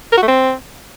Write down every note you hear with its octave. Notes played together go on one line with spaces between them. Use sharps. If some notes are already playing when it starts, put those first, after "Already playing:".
A#4
F#4
A3
C4